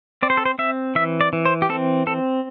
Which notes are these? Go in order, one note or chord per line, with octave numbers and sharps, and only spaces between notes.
C4 D5
C5
A4
C5
C4 E5
E3 E5
D5
E3
C5
G4
C4 A4
C4 A4